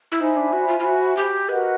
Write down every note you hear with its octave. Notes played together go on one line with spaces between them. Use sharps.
E4
D#4 C5 E5 G#5 B5
D4
F#4
F4
F4
F#4
G4
F#4 A#4 B4 D#5 F#5